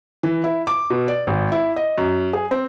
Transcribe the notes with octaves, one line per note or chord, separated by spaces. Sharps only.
E3
E4
D6
B2
D5
G#1
E4
D#5
F#2
G#4
C4